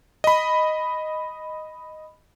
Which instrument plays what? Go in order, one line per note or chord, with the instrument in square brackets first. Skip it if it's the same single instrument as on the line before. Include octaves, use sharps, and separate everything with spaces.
[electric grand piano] D#5 B5